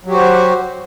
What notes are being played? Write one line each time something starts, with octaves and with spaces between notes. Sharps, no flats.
F#3 F#4 G4 C5